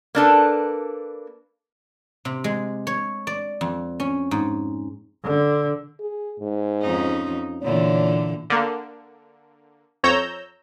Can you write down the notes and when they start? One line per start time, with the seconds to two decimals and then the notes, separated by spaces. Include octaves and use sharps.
0.15 A#3 D4 A4 B4
2.25 C3
2.44 G#3
2.87 C#5
3.27 D5
3.61 F2
4.00 C#4
4.31 G#2
5.24 D3
6.00 G#4
6.40 G#2
6.81 F2 C#4 D#4
7.62 A#2 D3 E3 C#5
8.50 D3 A#3
10.03 F2 C#5 A#5 E6 G6